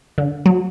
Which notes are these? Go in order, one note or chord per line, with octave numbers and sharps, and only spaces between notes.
D3
F#3